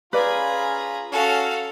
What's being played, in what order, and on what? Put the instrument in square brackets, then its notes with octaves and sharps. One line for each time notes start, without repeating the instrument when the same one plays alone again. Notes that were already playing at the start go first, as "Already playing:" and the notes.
[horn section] C#4 F4 [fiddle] G#4 A#5 [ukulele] B4 D5 [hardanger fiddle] B5
[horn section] C#4 [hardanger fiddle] F#4 F5 [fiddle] A4